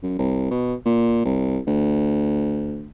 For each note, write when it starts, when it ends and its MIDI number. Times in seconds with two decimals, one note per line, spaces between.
0.03 0.17 42
0.19 0.47 36
0.51 0.74 47
0.86 1.24 46
1.25 1.59 36
1.67 2.87 38